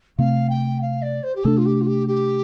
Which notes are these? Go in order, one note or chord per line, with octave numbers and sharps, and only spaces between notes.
C3 A3 C4 F5
G5
F5
D5
C5
G4
C3 A3 D4 A4
F4
G4
F4
G4
G4